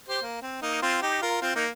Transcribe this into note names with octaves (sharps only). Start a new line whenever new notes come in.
G4 C5
A#3
C4
A#3 D#4
C4 F4
D#4 G4
F4 A#4
C4 F4
A#3 D#4